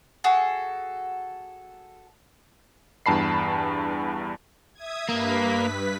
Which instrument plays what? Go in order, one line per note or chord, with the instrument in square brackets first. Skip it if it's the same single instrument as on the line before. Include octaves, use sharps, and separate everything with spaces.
[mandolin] F#4 G#4 A4
[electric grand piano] E2 G2 A5 B5 C7
[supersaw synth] E5 D#6 G#6
[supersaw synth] G2 B4 B6 [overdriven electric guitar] A#3